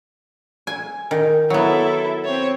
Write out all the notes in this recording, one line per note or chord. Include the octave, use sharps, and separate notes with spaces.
G#5
D#3
F#3 B3 E4 A4
C4 C#5